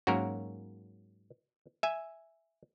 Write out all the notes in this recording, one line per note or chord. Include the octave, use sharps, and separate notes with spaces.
G#2 F#3 A#3 C#4 F#4 A#4
E5 G#5